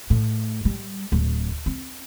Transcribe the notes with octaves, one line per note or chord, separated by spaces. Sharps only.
A2
G3
D1
C4